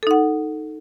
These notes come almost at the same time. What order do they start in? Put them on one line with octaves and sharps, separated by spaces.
A4 D#4 F#5